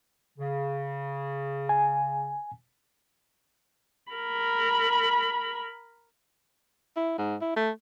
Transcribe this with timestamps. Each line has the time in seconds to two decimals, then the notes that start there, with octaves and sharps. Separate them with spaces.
0.38 C#3
1.69 G#5
4.12 A#4 B5
6.97 E4
7.18 G#2
7.41 E4
7.56 A3